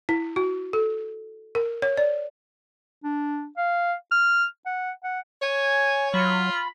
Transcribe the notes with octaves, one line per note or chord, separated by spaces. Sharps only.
E4
F#4
A4
A#4
C#5
D5
D4
F5
F6
F#5
F#5
C#5 G#5 G#6
F#3 F4 B5